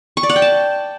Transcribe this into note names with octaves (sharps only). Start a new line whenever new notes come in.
C#6
D5
F#5
G5
A5